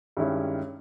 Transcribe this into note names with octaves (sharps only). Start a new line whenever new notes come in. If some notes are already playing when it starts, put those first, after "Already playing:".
G2 D#3 G#3 C#4 E4